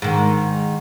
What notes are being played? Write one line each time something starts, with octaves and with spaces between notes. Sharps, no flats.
G#2 D#3